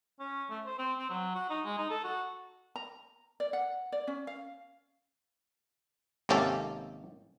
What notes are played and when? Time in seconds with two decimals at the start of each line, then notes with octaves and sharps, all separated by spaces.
0.19 C#4
0.50 A3
0.66 C5
0.78 C4
0.98 C4
1.10 F#3
1.35 F#4
1.50 D#4
1.65 G#3
1.78 D#4
1.90 A4
2.04 F#4
2.76 A#5
3.40 D5
3.53 F#5
3.92 D5
4.07 C#4
4.27 F5
6.29 G#1 C3 A#3 C#4 G4 A4